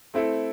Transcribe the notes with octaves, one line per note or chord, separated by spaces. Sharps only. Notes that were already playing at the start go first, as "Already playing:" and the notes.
A3 C4 E4 A4